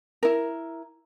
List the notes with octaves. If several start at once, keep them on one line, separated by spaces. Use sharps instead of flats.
E4 A#4